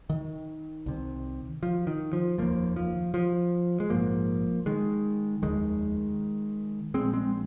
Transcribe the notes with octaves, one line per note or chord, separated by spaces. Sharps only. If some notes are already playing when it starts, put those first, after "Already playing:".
D#3
C2 C3
F3
D#3
F3
F1 D#2 F3 A#3
F3
F3
G#3
A#1 G#2 F3 A#3
D#3 G#3
F1 D#2 D#3 G#3
A#1 A#2 G#3 C4
G#3 C4